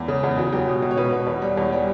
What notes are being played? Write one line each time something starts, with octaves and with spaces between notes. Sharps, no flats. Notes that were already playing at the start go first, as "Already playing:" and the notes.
Already playing: E2
C#3
E2
E2 F#4
F#3 G4
B2
B2
C#5
B2 B4
B2
E2 C#5
G3
E2 C#5
G3